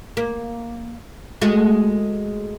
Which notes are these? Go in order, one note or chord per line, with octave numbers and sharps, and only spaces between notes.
A#3
G#3 A3 F#4